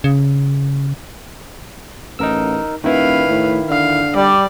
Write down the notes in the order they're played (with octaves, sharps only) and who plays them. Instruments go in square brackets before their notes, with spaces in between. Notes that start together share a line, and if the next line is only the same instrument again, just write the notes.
[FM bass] C#3
[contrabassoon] A1 [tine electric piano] D#4 A#4 E6
[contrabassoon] D#1 [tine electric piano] D#3 E4 [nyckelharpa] B4 F5
[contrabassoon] A2
[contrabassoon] D3 [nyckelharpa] F5
[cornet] G3 [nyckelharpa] D5